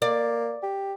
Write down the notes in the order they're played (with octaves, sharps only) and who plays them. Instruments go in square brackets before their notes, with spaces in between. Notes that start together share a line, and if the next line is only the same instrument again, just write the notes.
[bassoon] A#3 [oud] D5
[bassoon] G4